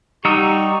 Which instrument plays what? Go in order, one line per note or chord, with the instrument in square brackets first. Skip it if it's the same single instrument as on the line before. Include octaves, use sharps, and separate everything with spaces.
[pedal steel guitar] G3 F#5 E6 [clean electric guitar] D#4 [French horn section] G4 [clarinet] C#6